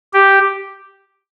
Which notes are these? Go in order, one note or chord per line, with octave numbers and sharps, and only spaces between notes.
G4